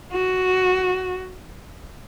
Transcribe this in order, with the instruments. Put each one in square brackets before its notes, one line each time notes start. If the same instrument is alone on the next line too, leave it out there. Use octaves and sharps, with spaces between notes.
[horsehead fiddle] F#4